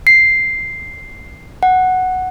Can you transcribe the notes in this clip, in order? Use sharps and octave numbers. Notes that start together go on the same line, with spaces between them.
C7
F#5